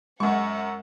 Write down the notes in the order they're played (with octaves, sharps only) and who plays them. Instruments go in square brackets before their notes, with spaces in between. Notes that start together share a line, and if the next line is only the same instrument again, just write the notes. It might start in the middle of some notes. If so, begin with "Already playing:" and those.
[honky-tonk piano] F#2 C#6 [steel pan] G#3 [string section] F#5